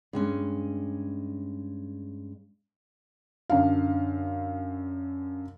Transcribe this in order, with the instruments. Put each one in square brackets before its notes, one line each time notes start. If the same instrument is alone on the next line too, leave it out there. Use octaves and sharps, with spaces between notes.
[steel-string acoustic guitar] G2 G#3 C#4
[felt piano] F#2 D3 F5